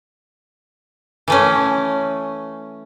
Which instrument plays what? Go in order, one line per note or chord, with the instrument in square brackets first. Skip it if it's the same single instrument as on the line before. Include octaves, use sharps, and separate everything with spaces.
[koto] E3 A3 C#4